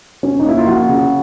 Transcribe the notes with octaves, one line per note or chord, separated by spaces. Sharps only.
C#4
D#4
A#3 E4
F4
F3 F#4
C#3